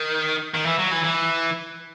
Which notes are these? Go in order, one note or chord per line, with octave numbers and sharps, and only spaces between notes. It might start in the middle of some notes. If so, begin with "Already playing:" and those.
Already playing: D#3
D#3
E3
F#3
E3
E3